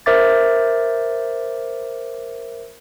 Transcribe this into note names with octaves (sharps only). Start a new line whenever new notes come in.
A#4 C5 E5 D6 A6